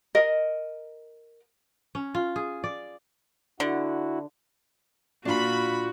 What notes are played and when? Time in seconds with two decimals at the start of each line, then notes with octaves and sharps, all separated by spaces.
0.15 A#4 D#5
1.95 C#4
2.15 F4
2.36 G#4
2.64 D5
3.60 D3 E4 F#4
5.25 A#2 D4 F4 F#4 B5